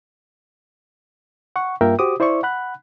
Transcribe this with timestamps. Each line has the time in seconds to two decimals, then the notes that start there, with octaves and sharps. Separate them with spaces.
1.56 F#5 C#6
1.81 G2 A#3 F4 A#4 E5 G5
1.99 F#4 G4 C5 D6 D#6
2.20 E4 C5 D5 E5 C#6
2.43 F#5 B5 F#6